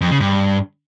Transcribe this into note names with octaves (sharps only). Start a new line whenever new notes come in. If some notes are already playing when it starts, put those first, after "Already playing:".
F2
C#3
G2